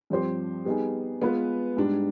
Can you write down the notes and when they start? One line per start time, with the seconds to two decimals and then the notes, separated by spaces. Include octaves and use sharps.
0.10 G2 F3 C4 G4 C5
0.65 G3 B3 D#4 G#4
1.21 G#3 B3 F4 B4
1.77 G#2 G3 D4